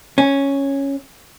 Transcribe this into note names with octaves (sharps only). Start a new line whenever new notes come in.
C#4